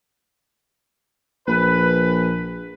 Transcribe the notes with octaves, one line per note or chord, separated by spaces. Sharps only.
A#1 B4